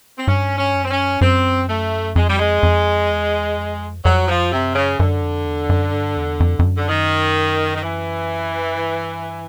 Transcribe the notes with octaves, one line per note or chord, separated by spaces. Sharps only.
C4
G2 C#4
C#4
F#2
C4
C#4
F#2 C4
A3
F2 G#3
G3
G#3
F2
E2
F2
F2 F#3
F3
F#2 C3
C#3
F#2 D3
F2
E2
F#2
G2
E2
F2
F2
F#2
D3
D#3
D#3
E3
G2